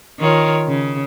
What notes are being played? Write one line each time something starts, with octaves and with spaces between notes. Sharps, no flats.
D#3 F4 C#5
C#3